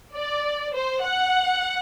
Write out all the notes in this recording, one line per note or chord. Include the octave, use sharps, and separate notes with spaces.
D5
C5
F#5